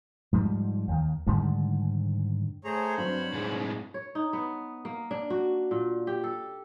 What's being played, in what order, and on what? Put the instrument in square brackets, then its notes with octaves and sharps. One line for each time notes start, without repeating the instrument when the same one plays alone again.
[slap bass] G#2 F3 G3
D#2 D#3
G#2 D3 D#3 G3
[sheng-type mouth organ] A3 G#4 A#5 [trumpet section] C5 C#5
[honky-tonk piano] G2 F#3 C4 [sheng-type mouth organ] B5
[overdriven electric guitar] A2 G#3
[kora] C#5
D#4
B3
A#3
D4
F#4
A#2
G4
A4